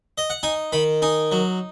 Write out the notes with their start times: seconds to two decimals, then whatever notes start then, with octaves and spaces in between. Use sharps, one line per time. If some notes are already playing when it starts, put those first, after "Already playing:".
0.18 D#5
0.30 F#5
0.43 D#4 G#5
0.72 D#3 B5
1.02 D#4 G#5
1.31 F#3